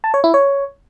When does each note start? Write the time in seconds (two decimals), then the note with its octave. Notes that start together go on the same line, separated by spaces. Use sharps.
0.04 A5
0.14 C#5
0.24 E4
0.34 C#5